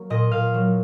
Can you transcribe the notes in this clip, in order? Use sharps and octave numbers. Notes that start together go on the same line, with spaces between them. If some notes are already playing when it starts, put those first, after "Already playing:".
Already playing: F#3 A#3
A#2 D#5
A#2 F5
F#3